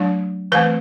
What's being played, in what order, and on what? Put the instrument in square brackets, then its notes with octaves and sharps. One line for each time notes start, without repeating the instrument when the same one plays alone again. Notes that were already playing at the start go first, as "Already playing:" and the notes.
Already playing: [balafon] F#3 A3 D4
E3 A3 C4 B4